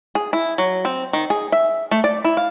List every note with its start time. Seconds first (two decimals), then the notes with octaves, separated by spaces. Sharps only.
0.15 G#4
0.33 E4
0.58 F#3
0.85 C4
1.13 D#3
1.30 G#4
1.52 E5
1.91 A3
2.04 D5
2.24 E4
2.37 F5